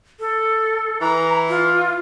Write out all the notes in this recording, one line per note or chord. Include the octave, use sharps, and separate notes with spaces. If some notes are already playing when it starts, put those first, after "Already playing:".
A4
E3 A#5
F4